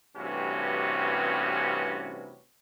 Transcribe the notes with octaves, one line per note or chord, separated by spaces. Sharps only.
A1 G2 C3 C#4 F#4 B4